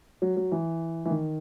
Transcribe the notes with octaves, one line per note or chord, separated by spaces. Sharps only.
F#3
F#3
E3
E3
D#3